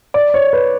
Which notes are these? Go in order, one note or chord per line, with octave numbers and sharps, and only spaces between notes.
D5
C#5
B4